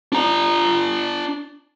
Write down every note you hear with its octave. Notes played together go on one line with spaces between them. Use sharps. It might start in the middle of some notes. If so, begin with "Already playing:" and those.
D4 A#5